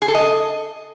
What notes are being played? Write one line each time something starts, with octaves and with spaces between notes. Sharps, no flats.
G#4
A4
D#5